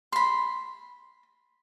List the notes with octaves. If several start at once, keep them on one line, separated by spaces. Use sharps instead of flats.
B5 C6